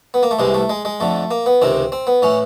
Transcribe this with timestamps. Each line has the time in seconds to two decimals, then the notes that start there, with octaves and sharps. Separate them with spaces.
0.14 B3
0.23 A#3
0.31 A3
0.39 C2 C3 E3 G#3
0.54 A3
0.70 G#3
0.85 G#3
1.00 F2 D3 A3
1.31 A#3
1.46 B3
1.62 C#2 C3 D#3 C4
1.92 C4
2.07 B3
2.22 A2 E3 C#4